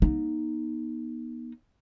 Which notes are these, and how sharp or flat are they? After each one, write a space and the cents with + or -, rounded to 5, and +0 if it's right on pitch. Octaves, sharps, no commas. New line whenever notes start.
B3 -45 D#4 +0